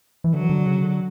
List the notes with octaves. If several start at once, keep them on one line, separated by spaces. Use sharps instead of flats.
E3
D3 F#3
E3
D3
C#3
D3